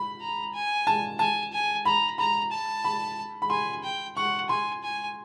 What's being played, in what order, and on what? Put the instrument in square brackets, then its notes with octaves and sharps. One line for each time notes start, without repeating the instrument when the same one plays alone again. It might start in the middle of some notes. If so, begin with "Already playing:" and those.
Already playing: [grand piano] B5
[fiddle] A#5
G#5
[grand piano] A5
[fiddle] G#5 [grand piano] A5
[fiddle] G#5
[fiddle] A#5 [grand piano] B5
[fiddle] A#5 [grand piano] B5
[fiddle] A5
[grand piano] B5
B5
[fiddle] G#5 [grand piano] C6
[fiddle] G5
[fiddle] F#5 [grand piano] C#6
[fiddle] G#5 [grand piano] C6
[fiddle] G#5